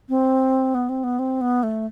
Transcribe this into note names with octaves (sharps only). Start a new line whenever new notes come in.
C4
B3
C4
B3
C4
B3
A3